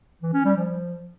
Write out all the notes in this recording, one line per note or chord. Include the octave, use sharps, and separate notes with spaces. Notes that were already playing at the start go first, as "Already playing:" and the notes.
E3
C#4
G3
F3